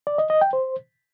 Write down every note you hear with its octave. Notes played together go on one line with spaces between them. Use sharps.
D5
D#5
D#5
G5
C5